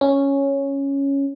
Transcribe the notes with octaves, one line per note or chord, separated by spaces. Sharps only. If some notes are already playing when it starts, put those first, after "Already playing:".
C#4